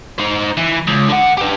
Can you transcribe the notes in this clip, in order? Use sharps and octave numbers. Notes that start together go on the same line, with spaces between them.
D#4 C5
E3
C#2
D3 F#5
G4 B4